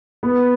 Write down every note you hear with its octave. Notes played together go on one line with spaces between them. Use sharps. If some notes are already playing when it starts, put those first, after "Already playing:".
B3